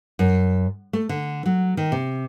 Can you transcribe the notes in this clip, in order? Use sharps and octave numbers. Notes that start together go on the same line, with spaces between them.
F#2
A3
D3
F#3
D#3
C3